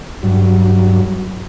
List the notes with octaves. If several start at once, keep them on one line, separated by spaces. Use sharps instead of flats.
G2 F#3